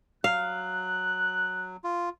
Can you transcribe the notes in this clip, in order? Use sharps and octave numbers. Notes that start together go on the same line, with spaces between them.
F#3 F5 F#6
F4